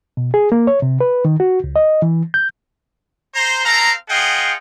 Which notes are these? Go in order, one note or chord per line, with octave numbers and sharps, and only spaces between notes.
B2
G#4
A#3
C#5
C3
B4
D#3
F#4
C#2
D#5
E3
G6
C5 A#5
C4 A4 F5 A#5
F4 G#4 D#5 F#5 G5